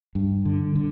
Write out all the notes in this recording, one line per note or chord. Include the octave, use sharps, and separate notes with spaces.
G2
D3
D3